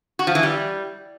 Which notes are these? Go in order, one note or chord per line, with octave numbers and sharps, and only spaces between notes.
F#4
F3
E3
G3